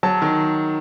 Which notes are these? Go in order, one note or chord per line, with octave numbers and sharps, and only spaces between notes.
F#3 A5
D#3